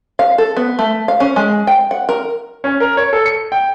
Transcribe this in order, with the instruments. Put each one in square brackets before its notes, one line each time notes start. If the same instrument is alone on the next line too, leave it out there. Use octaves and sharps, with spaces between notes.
[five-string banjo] F5
A4
B3
A3
F5
C#4
G#3
G5
F#5
A#4
[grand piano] C#4
A#4
C#5
A4
C#7
G5